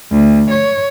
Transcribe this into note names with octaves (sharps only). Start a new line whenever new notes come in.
D2
C#5